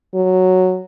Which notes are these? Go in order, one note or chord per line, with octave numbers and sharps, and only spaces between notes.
F#3